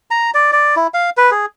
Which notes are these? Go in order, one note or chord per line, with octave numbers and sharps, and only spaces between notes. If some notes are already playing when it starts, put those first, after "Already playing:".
A#5
D5
D5
E4
F5
B4
G#4